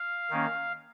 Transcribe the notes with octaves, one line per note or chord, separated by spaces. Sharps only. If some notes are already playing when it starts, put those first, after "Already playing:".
Already playing: F5
D#3 A#3 C#4